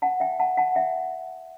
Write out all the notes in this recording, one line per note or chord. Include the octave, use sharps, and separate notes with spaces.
F#5 A5
E5 G5
F#5 A5
F#5 A5
E5 G5